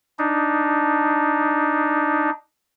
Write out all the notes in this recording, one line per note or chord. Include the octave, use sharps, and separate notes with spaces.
D4 D#4